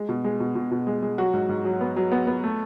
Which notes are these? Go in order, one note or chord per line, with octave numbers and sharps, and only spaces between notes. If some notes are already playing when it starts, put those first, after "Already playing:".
Already playing: G#3
B2
G#3
B2
B2
B2
G#3
G#3
F#3 F#4
G#2
G#2
F#3
B3
F#3
B3
B3
A3